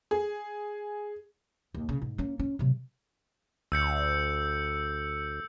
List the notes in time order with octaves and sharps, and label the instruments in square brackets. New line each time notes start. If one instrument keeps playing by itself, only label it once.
[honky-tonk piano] G#4
[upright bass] D#2
C#3
G#2
A#3 C#4
C#4
C3 F#3
[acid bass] D2 [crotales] E6 G6 C#7